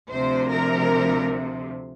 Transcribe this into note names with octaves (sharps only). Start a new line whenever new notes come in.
D2 C3 F3 C5
A#4